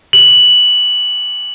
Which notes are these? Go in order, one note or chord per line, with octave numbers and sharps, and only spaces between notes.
F#7